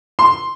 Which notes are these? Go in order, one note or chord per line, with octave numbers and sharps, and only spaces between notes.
C6